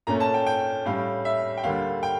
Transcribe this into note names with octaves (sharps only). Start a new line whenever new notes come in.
A#2 A3 C#4 A#5
A5
G5
G5
A2 G3 C#4 F5
E5
G5
D2 D3 G3 A#3 F5
G5